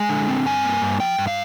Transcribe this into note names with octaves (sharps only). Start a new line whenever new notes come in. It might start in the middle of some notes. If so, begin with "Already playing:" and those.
Already playing: G#3 G#5
D3
C4
G2 G#5
A#3
G2
F3 G5
G2
F5